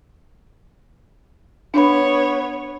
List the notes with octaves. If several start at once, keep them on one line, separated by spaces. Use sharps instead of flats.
B3 D4 C#5 B5